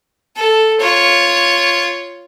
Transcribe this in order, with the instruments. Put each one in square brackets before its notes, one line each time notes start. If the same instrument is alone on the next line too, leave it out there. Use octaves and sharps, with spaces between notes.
[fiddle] A4
F4 C#5